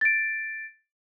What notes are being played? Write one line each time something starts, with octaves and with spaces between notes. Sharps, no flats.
A6 D7